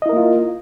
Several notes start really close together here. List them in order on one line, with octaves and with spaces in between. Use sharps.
D#5 E4 A#4 A#3 F4